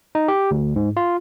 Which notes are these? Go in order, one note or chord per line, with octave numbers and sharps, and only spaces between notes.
D#4
G4
D2
G#2
F4